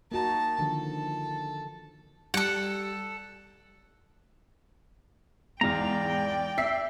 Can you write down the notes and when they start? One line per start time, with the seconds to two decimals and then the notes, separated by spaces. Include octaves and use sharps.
0.12 A#3 D#4 F#4 A5
0.59 D3 D#3 F3 A4
2.34 G3 A4 F#5
5.61 E2 G#2 D5 F5 G5 A#5
6.58 E5 B6 C7